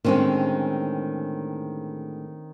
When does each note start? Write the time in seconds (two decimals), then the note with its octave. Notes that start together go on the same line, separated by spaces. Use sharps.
0.05 A2 D3 D#3 G#3 C4 C#4